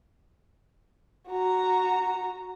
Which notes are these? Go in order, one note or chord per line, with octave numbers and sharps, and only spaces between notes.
F#4 A#5